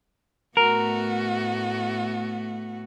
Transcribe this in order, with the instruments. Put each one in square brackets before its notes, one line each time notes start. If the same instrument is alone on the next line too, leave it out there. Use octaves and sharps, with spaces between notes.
[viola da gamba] A2 A3 B3 [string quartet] F#4 [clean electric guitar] A#4